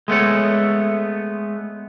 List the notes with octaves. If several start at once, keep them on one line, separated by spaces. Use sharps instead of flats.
G#3 A3 B3 C#5